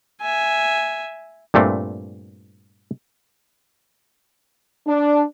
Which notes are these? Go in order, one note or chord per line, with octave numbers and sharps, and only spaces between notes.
E5 G#5
G2 A#2 A3 C4
D4